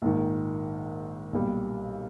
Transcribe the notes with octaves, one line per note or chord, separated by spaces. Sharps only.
A#1 G#2 D#3
B1 A#2 G3